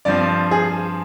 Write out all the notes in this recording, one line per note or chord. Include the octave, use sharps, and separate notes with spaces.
G2 F3 C4 D5
G#4